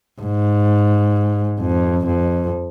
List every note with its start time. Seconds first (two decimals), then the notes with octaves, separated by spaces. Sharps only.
0.21 G#2
1.60 F2
2.06 F2